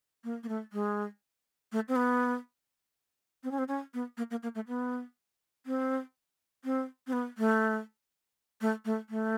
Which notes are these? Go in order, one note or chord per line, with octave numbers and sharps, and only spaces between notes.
A#3
A#3
A3
G#3
A3
C4
B3
C4
C#4
C4
C#4
B3
A#3
A#3
A#3
A3
B3
C4
C4
C4
B3
A3
A3
A3
A3